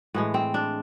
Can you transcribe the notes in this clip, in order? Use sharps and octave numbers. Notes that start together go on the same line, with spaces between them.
A2 E3 G#3
C4
D4